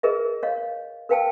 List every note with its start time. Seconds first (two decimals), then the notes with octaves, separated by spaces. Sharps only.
0.03 G#4 A#4 B4 D#5 E5
0.43 C#5 D#5 F5
1.09 A#4 B4 F5 G5 A5 E6